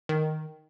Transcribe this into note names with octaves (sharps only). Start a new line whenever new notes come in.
D#3